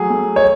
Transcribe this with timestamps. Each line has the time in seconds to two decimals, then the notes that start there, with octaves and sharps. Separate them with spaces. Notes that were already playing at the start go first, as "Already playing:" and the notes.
Already playing: F#3 A3 G#4
0.10 A3
0.36 C#5